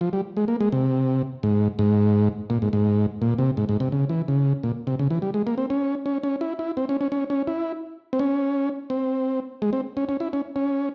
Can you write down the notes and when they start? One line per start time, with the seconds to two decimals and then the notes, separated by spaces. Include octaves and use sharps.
0.01 F3
0.13 G3
0.37 G#3
0.48 A#3
0.61 G#3
0.72 C3
1.43 G#2
1.79 G#2
2.50 A#2
2.62 G#2
2.73 G#2
3.22 A#2
3.38 C3
3.57 G#2
3.69 G#2
3.80 C3
3.92 C#3
4.09 E3
4.28 C#3
4.63 A#2
4.87 C3
4.99 C#3
5.10 E3
5.22 G3
5.34 G#3
5.47 A#3
5.58 C4
5.70 C#4
6.06 C#4
6.23 C#4
6.41 E4
6.59 E4
6.77 C4
6.89 C#4
7.01 C#4
7.12 C#4
7.30 C#4
7.47 E4
8.13 C4
8.19 C#4
8.90 C4
9.62 G#3
9.73 C4
9.97 C#4
10.09 C#4
10.20 E4
10.33 C#4
10.56 C#4